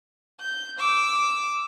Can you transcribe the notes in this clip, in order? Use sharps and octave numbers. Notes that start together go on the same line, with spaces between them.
G6
D6 E6